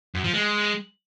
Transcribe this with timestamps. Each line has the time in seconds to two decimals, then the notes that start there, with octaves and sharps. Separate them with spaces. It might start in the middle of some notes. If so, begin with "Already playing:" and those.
0.15 F#2
0.24 F3
0.34 G#3